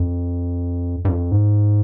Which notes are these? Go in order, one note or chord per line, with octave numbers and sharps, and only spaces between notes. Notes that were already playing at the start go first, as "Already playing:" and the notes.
Already playing: F2
G2
F2
G#2